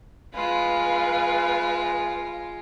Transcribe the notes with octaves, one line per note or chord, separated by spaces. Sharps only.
G#3 F4 B4 F5